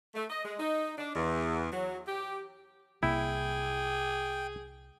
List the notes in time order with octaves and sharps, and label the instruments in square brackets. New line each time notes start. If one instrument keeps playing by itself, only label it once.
[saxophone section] A3
D#5
G#3
D#4
D4
E2
F#3
G4
[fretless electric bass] C2 A#3 [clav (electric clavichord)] E4 [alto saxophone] G#4 [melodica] G5